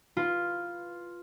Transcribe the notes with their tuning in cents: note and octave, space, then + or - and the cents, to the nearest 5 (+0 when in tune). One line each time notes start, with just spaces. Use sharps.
F4 +0 B4 +0